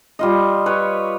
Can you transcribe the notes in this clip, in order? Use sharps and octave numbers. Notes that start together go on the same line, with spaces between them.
G3 F4 D#5
B4 C#5